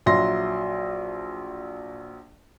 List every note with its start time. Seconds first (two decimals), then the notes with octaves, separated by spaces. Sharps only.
0.06 A#1 F#3 E5 C6 A#6